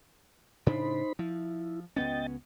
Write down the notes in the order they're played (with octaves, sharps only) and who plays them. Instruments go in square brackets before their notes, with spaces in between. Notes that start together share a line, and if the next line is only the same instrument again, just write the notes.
[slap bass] A2 C#3 D4 [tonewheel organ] D#4 C5 B5
[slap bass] F3 [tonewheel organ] E4
[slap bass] C#2 B3 C#4 [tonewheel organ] D#5 G5 A6